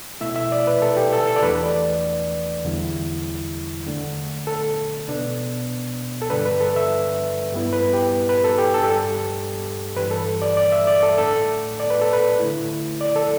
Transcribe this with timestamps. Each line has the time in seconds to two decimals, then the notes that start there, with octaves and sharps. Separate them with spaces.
0.21 B2 A3 E4 E5
0.36 E5
0.52 D5
0.67 B4
0.82 A4
0.97 G4
1.13 A4
1.27 A4
1.36 D5
1.42 E2 E3 A3 D4 B4
1.63 D5
2.64 E2 D3 G3 E4
3.87 D3 A3 D4
4.47 A4
5.08 B2 B3 D4
6.22 A4
6.30 G2 D3 G3 D4 B4
6.46 B4
6.60 A4
6.76 E5
7.53 G2 G3 B3 E4
7.73 B4
7.93 G4
8.29 B4
8.44 A4
8.58 G4
8.74 G2 G3 D4 A4
8.83 G4
8.90 A4
9.96 G2 E3 G3 B4
10.11 A4
10.42 D5
10.57 D5
10.72 E5
10.87 D5
11.03 A4
11.18 A2 A3 D4 A4
11.80 D5
11.90 B4
12.01 A4
12.13 B4
12.39 D3 A3 E4
13.01 D5
13.16 A4